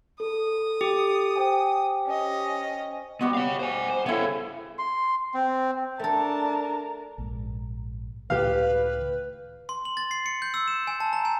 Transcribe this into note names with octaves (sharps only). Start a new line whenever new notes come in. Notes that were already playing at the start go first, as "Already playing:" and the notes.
A4 D#6
G4
C5 G5 G#5
C#4 D#5
G3 B3 F#4 D#5
C#5 F5
C5 G#5
C5
C#3 B3 E4 A4
C6
C4
A3 D4 A4 A#4 A5
A#1 G#2
C#2 A2 D#3 G4 B4 F5
C6
F#7
A6
C7
C#7
G6
E6
E7
G#5
A5
A#5
G#5